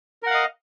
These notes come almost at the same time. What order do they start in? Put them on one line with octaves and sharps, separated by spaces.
A#4 F#5 F5 D#5